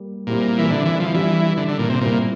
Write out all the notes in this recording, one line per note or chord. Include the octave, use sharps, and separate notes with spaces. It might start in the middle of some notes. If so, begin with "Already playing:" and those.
Already playing: G3 A#3
A#2 G3 C4 E4 G4
E3
D3
E3
F3
E3 G3 D4 G4
D3
D3
A#2
C3
A#2 G3 C4 E4